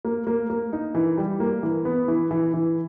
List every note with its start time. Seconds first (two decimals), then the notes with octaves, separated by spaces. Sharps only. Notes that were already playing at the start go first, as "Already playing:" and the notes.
0.05 A#3
0.27 A#3
0.50 A#3
0.73 D#4
0.95 E3
1.17 G3
1.40 A#3
1.63 E3
1.85 B3
2.08 E3
2.31 E3
2.54 E3